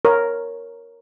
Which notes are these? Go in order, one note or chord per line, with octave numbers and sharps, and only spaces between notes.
A#4 C#5